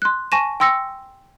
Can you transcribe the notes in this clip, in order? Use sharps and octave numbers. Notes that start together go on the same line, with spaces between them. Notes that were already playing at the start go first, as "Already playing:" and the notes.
C6 F#6
G#5 A5 C#6 A#6 D#7 E7
G5 C6 E6 A#6 C#7